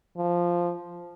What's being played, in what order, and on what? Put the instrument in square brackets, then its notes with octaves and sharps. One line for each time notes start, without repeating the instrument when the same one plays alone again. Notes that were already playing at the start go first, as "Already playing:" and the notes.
[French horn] F3